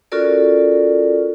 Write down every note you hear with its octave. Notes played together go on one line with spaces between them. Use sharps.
C#4 F4 F#4 A4 A#4 D5